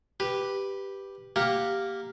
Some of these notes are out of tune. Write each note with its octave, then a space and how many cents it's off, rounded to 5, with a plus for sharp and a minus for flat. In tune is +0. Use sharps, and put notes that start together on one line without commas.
G4 +0 B4 +0
A#3 -5 G4 +0 F#5 +0